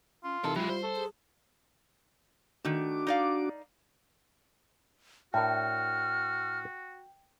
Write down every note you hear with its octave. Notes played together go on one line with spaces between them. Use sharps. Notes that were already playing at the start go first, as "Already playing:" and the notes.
C#4 F4
C3 E3 D#4 A4 A#4 A5
F#3 G#3 E4 F4 G4
G3 C5
A4
G#4
D#3 A3 D4 F#4 D6
D#4 D5 F5
A2 D4 F#4 A#4 G5 F6